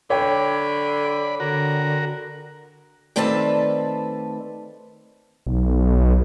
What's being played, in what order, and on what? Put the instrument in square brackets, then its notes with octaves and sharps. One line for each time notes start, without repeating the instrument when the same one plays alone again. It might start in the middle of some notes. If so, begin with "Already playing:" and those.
[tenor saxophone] D3 [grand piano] C#5 G5 [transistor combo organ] D5 B5
[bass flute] D3 [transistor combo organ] F#4 A#4
[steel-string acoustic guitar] D#3 A3 C4 B4 D5 A5
[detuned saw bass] B1